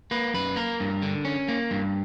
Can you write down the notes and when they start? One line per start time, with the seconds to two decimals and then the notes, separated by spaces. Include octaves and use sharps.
0.11 A#3 B4
0.34 F#2 B4
0.56 A#3 A#4
0.80 G2
1.03 D3
1.25 C#4
1.48 A#3
1.71 G2